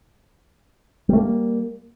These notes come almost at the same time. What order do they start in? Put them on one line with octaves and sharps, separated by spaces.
G3 A3 A#3